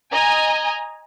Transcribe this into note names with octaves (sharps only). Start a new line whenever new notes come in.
D#5 G#5 A#5